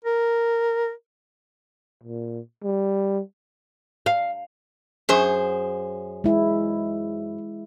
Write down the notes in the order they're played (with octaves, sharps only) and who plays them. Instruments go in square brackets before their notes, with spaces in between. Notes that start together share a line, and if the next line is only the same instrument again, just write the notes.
[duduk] A#4
[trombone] A#2
G3
[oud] F5
[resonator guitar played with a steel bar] F#2 G#4 C5
[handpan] G#3 E4